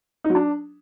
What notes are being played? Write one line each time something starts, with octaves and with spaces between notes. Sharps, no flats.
D#4
F#3
D4